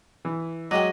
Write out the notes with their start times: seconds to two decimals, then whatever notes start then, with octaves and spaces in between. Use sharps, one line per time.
0.25 E3
0.71 F#3 G#3 D#5 F#5 G5 D6